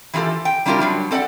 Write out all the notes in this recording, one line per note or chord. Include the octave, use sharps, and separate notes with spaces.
E3 F#3 F4 G4 A4
G5
G3 D4 E4 F4 G4 A#4
F#3 G3 D4
C4 A4 D5 E5 F#5